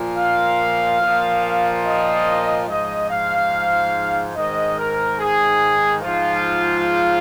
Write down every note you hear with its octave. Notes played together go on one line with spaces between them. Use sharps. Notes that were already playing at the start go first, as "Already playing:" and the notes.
Already playing: A#2 F3
F5
A#2 F3
D#5
G#2 F3 D#5
F5
G#2 D#3 D#5
A#4
G#4
G#2 F3 F4